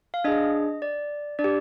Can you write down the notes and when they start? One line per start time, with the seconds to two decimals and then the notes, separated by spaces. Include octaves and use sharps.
0.14 F5
0.24 D4 G#4 D#5
0.82 D5
1.39 D4 D5
1.44 G4